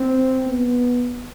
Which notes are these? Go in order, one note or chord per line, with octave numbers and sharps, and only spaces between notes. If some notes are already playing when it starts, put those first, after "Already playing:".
Already playing: C4
B3